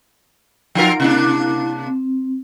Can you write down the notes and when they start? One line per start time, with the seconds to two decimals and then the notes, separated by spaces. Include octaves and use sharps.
0.75 F3 D#4 F4 A#4 F#5
1.00 C3 A#3 D4 E4
1.86 C4